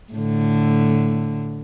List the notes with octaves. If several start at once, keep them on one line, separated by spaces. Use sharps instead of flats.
A2 D3